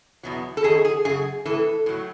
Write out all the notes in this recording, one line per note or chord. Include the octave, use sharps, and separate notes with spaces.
E2 B2 F#3
A4
F#2 D#3 F#3 G#4
G#4
F#2 C#3 G#4
A2 E3 A4
A2 F#3